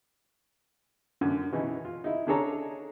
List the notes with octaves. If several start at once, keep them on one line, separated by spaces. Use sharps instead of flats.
F#2 D3
B2 E3 C#4 D#4
F4
D#4 E4
C#4 D4 G#4 A4 C#5 A#5